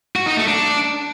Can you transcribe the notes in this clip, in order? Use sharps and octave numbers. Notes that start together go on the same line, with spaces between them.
F#4
D#4
A3
D4